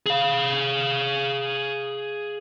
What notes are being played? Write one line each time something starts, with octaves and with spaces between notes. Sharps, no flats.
G#4 F5